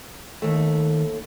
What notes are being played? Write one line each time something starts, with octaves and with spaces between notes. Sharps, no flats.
D#2 D#3 A3